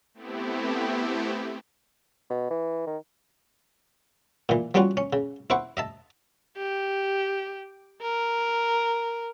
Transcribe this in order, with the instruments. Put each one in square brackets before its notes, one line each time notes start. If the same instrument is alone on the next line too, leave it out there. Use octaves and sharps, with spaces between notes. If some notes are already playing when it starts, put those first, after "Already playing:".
[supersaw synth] A3 B3 C4 E4 G4
[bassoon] B2
E3
D#3
[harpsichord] A#2 E3
F3 G3 B3 C#4 F4 F#4
C#4
C#3
E4 B4 C5 F#5 C#6
D#5 E5 A5
[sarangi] G4
A#4